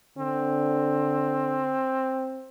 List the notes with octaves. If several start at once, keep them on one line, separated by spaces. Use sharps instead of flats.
D3 C4